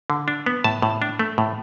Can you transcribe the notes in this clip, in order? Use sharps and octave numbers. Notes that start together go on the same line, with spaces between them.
D3
D4
B3
A2 A5
A2
D4
A3
A2